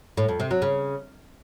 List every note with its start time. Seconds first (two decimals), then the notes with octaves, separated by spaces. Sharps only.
0.17 A2
0.29 F2
0.40 C3
0.51 F#3
0.62 C#3